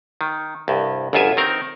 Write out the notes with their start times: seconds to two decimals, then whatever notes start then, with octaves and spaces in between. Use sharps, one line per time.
0.21 D#3
0.68 C2 G2
1.13 G1 C#2 F#2 F4 E5 G#5
1.37 D#3 C4 A#4